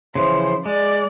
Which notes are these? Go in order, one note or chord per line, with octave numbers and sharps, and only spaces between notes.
C#3 E3 F3 C5
G#3 D5